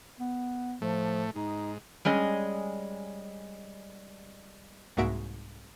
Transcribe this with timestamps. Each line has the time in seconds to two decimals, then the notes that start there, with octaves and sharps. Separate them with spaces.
0.20 B3
0.82 A2 F3 A3
1.36 G#2 D#4
2.05 G3 G#3 C#4 D#5
4.97 C2 G#2 A#3 F#4 E5 D7